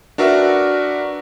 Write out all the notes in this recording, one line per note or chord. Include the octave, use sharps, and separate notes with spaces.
D4 F#4 A#4 B4 E5